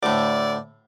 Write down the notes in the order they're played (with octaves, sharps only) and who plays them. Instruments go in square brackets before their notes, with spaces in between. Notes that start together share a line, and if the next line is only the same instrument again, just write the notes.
[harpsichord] D2 A2 [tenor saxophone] D5